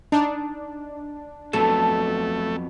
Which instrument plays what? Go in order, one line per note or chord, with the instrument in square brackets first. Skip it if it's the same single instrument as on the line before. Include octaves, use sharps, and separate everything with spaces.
[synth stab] D4 [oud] D#4
[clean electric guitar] F2 F#3 B3 [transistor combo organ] A3 [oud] A4